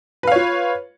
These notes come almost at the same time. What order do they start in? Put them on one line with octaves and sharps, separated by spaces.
B4 F5 C#5 F4